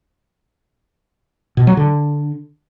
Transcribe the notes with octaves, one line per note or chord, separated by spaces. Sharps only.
B2
F#3
D3